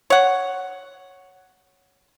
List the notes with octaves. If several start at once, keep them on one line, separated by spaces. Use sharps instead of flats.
C#5 F#5